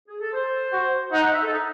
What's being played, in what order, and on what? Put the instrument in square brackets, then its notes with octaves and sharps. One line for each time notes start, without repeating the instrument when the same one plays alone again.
[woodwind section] G#4
A4
C5
[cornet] F#4
[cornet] D#4 [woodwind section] F#5
[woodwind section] F#5
E5
A4
D#4